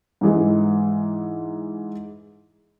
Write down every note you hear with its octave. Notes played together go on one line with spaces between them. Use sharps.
G#2 E3 G#3